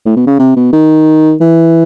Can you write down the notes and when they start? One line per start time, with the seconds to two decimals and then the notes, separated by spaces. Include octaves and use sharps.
0.05 A2
0.16 B2
0.27 C#3
0.39 C3
0.56 B2
0.73 D#3
1.41 E3